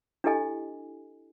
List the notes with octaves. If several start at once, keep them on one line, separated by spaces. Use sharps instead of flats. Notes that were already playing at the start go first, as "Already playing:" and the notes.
D4 E4 G4 A4 D#5 G#5